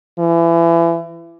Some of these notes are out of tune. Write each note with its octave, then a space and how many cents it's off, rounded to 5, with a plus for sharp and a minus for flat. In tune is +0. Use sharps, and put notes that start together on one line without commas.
E3 +30